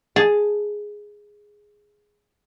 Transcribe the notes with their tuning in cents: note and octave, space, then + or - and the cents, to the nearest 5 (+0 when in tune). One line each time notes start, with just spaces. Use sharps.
G#4 +0 A5 +0